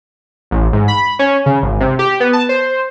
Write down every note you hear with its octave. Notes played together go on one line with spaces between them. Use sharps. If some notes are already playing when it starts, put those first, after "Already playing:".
A1
G#2
B5
C#4
C#3
G#1
C3
G4
B3
A5
C5